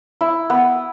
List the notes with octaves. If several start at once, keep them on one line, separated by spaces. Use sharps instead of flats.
E4
B3